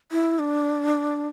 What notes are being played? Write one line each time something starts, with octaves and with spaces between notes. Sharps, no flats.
E4
D4